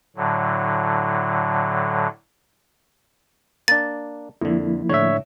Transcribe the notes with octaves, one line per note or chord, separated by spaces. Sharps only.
A2 D3 F#3
A#3 D4 A6
F2 D3 F3 A#3 E4
A2 D3 C#5 E5